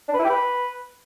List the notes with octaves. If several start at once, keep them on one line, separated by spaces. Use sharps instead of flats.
D4
B4
E4
G4
B4